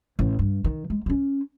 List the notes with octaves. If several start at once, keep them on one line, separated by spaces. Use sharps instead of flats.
A1
G2
D#3
G#3
A#3 C#4